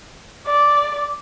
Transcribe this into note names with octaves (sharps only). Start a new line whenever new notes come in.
D5